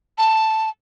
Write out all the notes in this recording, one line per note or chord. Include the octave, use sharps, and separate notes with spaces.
A5